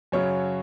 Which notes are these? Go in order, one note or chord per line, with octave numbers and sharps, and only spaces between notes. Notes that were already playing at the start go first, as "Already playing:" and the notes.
F#2 C#3 F#3 C#5